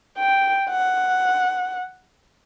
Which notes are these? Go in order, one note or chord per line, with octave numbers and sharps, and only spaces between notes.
G5
F#5